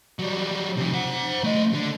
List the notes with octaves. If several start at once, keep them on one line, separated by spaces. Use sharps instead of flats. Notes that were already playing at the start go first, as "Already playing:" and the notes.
F#3 G3
C3 F3
C5 F#5
A3 D#5
D3